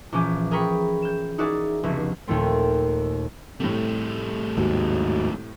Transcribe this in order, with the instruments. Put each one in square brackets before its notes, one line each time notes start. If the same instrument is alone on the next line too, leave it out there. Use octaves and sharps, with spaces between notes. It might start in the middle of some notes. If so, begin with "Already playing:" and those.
[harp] A#1 E3 C#4 G#5 D6 G6
G#4 A#4 G5 B5 C#6
G6 E7
D#4 E4 F#4 G#4 A#4 D5
F1 C#2 B3 E4
D#2 A#2 D#3 A3 C4
[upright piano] A2 C3 [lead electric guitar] G3 A3
[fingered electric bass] D#2 G#2 [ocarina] F#4